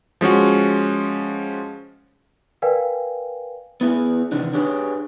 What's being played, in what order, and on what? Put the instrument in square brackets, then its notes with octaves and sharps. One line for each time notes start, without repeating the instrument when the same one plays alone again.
[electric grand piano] F3 G#3 C#4 F#4
[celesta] A#4 B4 D5 F5 G5 G#5
[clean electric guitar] B3 E4 G#4
C3 D#3 E3 D4
D4 G4 G#4 B4 C#5